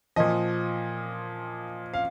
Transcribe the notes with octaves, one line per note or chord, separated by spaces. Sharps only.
A#2 F3 D#5
F5